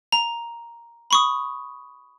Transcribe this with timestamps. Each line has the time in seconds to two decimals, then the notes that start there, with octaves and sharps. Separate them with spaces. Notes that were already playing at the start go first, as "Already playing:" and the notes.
0.12 A#5
1.11 B5 C#6 D#6